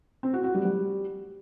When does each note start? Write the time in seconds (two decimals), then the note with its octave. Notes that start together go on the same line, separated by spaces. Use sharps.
0.23 C4
0.34 F#4
0.44 F#4
0.55 G3
0.65 G3